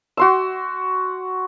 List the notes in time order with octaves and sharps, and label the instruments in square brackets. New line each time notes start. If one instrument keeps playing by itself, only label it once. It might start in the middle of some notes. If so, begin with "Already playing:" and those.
[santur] F#4 C6 E6